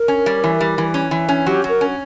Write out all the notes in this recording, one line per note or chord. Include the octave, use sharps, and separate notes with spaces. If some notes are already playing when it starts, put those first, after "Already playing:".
Already playing: A#4
C#4
G3
E3
G3
E3
C#4
E3
C#4
F#3 G4
F#3 A#4
C#4